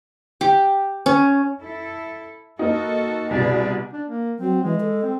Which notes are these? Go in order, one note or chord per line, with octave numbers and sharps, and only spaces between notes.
G4
C#4
E4 A4
A#3 D#4 F#4 A4
C2 B2 G#4 B4 D5
D4
A#3
F#3 C4
E3 G#3
A4
C4